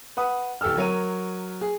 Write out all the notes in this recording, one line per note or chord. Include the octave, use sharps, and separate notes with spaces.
B4 F#5 D#6
D1 G4 A4 E6 F6
F#3 A#4 C#5 D#7
G#4